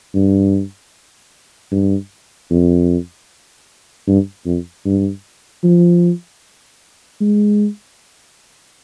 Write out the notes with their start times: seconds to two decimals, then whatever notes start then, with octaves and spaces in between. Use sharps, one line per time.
0.14 G2
1.72 G2
2.50 F2
4.07 G2
4.46 F2
4.85 G2
5.63 F3
7.20 G#3